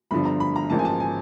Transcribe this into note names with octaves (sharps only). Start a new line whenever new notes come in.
G1 G2 D3 F3 B5
A#5
B5
A#5
A1 G#2 F3 A#3 A5
G#5
A5
G#5